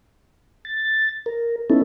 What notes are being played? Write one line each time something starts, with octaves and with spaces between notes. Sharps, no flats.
A6
A#4
B3 C#4 D#4 E4 A4